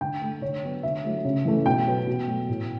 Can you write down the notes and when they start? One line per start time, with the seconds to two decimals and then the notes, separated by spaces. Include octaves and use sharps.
0.01 D3 G5
0.21 A3
0.42 D3 C#5
0.63 F#3 B3
0.83 D3 E5
1.04 F#3 A3
1.25 C#3
1.45 E3 A3
1.65 B2 G5
1.86 F#3 B3
2.07 B2
2.27 F#3 A3
2.49 A2